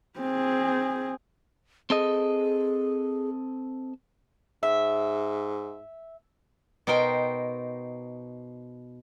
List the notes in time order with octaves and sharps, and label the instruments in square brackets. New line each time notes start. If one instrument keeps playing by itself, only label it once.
[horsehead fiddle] C4 G#4
[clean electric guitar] C4 A4 D#5 [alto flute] G#4
[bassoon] G#2 [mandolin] E5
[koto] B2 D#4 A#4 C5 G5